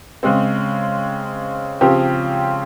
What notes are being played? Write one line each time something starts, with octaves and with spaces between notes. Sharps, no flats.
C#3 G#3 C4
C#3 F3 C4 G4